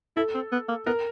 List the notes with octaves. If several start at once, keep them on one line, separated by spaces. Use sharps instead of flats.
E4 A4
C4
B3
A#3
B3 A#4